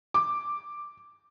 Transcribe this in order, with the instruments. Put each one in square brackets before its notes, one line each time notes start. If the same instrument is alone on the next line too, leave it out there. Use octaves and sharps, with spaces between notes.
[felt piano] D6